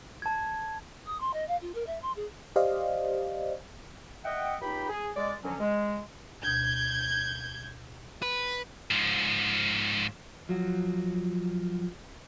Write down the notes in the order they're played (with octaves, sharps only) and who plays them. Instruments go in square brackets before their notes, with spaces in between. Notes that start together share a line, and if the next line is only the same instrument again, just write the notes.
[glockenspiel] A5 G#6
[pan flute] D#6
C6
D#5
F5
F4
A#4
E5
C6
G#4
[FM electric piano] G4 C5 D5 D#5 F5
[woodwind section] D#5 E5 F#5 G5
C#2 D#4 G4 G5 B5
G#4
G#3 D5
D3 F3 F#3 C#4
G#3
[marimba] D2 B2 [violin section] G6 G#6
[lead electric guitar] B4
[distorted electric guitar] G#2 F3
[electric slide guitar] F3 F#3 F#4